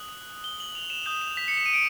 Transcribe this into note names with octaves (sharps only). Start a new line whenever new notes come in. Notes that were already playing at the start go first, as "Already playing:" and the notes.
Already playing: D#6 F#6 F#7
G7
F#7
F7
E7
D#6 G6 E7
F7
B6
C#7
E7
D#7
D7